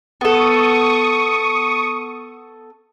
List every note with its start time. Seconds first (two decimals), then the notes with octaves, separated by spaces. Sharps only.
0.21 B3 A4 C#6 D#6